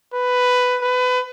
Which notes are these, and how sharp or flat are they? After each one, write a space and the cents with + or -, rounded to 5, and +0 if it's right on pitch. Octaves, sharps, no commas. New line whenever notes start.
B4 +10
B4 +25